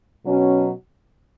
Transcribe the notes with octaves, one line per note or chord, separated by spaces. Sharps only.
B2 F#3 C#4 F#4